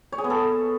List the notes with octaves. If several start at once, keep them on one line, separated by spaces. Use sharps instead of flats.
C#5
G#4
B3
A4